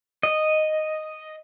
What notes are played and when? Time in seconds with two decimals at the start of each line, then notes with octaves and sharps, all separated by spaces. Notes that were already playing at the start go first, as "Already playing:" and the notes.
0.23 D#5